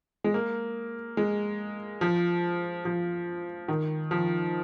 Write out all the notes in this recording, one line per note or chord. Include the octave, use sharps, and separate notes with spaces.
G#3
A#3
G#3
F3
F3
D#3
F3